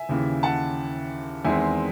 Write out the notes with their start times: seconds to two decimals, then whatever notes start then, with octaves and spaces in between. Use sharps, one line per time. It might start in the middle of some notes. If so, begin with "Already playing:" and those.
Already playing: E5 G#5
0.09 D#2 C#3 E3
0.43 F#5 A5
1.45 E2 D#3 G#3 C4 E5 G#5